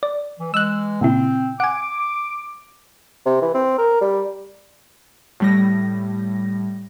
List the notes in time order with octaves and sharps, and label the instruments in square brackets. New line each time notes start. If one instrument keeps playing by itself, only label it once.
[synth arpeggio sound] D5
[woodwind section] E3
[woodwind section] E3 G#3 [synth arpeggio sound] E6 F#6
[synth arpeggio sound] A#2 C#3 E4 [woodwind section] C4
[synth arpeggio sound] F#5 G#5 [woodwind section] D6
[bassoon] C3
E3
C4
A#4
G3
[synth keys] A2 G3 A#6